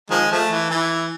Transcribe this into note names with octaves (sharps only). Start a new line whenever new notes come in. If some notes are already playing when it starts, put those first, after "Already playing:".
D#3 F3 G#3
F3 A3
E3
E3